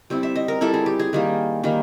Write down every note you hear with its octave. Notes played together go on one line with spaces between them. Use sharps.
G3 C4 E4
E5
D#5
A#4
G3 C4 E4 A4
G#4
G4
G#4
D#3 G3 A#3
D#3 G3 A#3